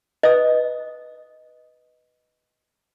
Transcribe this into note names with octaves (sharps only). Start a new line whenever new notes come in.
B4 D#5 D#6